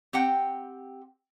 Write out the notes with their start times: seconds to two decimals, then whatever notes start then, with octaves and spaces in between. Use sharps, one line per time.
0.13 C4 G4 F#5 G5